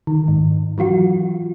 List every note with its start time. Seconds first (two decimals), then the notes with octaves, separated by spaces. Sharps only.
0.07 D#3
0.28 G#2
0.78 E3 F#3 F4 F#4